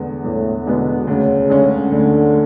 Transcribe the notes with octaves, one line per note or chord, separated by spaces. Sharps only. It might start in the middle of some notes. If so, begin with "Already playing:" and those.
Already playing: E2 D3 G#3 B3
E2 A2
B2 D3 G#3 B3
D2 C#3
D3 G#3 C#4
D2 D3